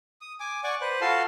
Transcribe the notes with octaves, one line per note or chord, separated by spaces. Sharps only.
D#6
G#5 D6
D5 F#5 G#5 C#6 D6
B4 C5 F#6
F4 F#4 A4 F5 A5 C6